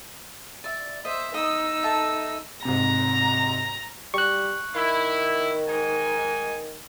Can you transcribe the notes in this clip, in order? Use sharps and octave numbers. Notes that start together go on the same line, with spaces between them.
D5 E5
C5 D#5 E5
D#4 D#5 D#6 E6
A4 E5
G#2 C3 A#5
G3 C#6 F#6
D#3 E4
G#2 D#4 G#5